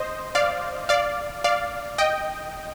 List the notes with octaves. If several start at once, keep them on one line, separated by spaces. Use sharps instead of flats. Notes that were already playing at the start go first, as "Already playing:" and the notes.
Already playing: C5 D#5
D5 F5
D5 F5
D5 F5
D#5 G5